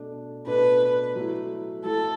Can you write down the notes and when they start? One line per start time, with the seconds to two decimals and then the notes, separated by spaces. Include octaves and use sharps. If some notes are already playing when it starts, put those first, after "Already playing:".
Already playing: B2 A3 D4 A4
0.46 B2 A3 D4 A4 B4
1.15 F#3 A3 E4
1.85 F#3 A3 E4 A4